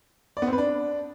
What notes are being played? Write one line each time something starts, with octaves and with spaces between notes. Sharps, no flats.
D5
B3
C4
B4
D4